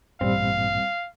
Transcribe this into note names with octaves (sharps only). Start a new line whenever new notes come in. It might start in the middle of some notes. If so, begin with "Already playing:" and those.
A1 G2 A#2 G3 C4 F5